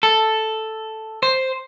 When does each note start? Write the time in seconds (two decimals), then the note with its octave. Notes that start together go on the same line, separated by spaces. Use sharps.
0.03 A4
1.23 C5